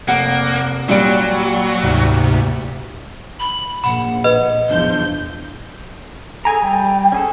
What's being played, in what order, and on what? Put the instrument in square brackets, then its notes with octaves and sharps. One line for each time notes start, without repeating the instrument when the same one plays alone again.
[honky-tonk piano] F1 F#5 [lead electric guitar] A#3
[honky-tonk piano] A#2 G3 D7 [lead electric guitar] F#3
[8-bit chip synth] D2 G#2 C3
[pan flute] B5
[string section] A#1 [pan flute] F#5 [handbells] B5
[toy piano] B4 [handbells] D#5
[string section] E2 F3 G6 [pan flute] D4
[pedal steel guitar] G#4 G#5 A#5 [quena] A4
[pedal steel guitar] G3 [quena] G5
[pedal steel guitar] C#4 G#4 A4